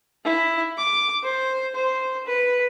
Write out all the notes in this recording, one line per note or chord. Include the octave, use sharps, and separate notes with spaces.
E4
D6
C5
C5
B4